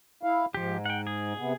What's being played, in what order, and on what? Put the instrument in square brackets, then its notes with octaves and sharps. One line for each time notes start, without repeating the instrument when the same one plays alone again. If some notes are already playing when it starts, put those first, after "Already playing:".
[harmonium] E4 F5
[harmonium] G#2 [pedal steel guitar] F3 G4
[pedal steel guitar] F#5 G5
G#4
[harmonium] C3 B3